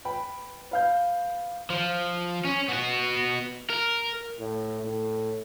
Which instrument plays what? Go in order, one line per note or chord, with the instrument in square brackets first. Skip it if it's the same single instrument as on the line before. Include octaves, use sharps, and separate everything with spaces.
[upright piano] B4 G5 B5
B4 F5 G6
[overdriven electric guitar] F3
C#4
B3 F#4
A#4
[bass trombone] A2
A2